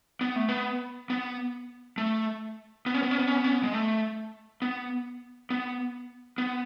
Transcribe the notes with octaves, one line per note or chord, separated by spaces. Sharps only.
B3
A3
B3
B3
A3
B3
C#4
B3
C#4
B3
C#4
B3
C#4
B3
G#3
A3
B3
B3
B3